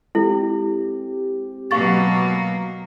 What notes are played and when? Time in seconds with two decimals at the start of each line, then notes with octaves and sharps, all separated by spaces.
0.15 G#3 C4 E4 G4 A4
1.71 B2 F#3 A#3 F5 C#6 A6